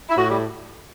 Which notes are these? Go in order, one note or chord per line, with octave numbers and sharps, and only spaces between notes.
E4
A2 F#4
G3